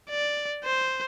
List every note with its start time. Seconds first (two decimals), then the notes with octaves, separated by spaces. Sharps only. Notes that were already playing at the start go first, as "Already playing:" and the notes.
0.10 D5
0.64 C5